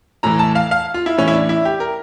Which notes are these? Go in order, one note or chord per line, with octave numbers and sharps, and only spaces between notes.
A2 E3 A#5
A5
F5
F5
F4
E4
A2 E3 C#4
E4
D4
E4
G4
A#4